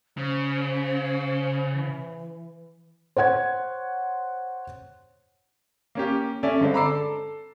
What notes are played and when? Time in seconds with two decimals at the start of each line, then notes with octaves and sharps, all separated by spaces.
0.17 C#3 C5
1.73 E3
3.16 C5 C#5 F#5 G#6
5.95 A#3 C#4 G4
6.43 C#4 A4 D5 E5 G#5
6.61 G2 D3 G#3 C4
6.74 A#5 B5 D6 E6 C7
6.86 A4